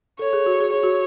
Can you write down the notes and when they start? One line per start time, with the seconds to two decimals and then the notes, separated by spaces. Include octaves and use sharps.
0.19 A4 C#5
0.33 G#4
0.46 F#4
0.60 G#4
0.73 G#4 C#5
0.83 F#4